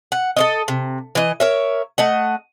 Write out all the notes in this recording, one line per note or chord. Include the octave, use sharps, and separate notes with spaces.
F#5
A4 C#5 D#5
C3
E3 D#5
A#4 C#5 E5
A3 D#5 F#5